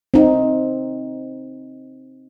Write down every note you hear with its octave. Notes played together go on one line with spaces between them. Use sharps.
C4 D#4